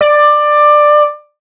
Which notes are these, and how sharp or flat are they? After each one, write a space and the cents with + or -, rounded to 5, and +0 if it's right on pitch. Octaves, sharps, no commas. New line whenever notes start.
D5 +15